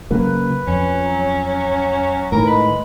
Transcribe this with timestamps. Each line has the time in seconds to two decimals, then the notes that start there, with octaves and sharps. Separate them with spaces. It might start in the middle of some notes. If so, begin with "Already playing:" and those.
0.11 C#3 F#3 A#3 B4
0.67 F2 C#4
1.01 F#3
2.32 A2 D#3 E3 A#4
2.47 G#3 B4